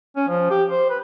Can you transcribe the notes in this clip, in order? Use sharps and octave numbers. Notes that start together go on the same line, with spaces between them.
C#4
F3
G4
C5
B4